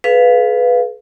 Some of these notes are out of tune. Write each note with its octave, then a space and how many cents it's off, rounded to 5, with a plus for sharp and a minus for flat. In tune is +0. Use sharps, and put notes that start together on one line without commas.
G#4 +45 B4 +5 F5 +0